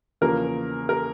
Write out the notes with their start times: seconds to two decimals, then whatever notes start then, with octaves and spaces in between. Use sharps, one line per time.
0.21 E2 C#3 F3 A#3 A#4
0.89 A#4